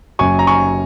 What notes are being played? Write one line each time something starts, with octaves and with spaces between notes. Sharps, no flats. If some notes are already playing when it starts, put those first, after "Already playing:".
F#1 F#2 F#3 G#5 C#6
A#5
G#5 C#6